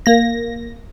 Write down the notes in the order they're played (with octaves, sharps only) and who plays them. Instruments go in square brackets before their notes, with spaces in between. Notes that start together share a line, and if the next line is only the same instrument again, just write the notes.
[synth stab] A#3 A#6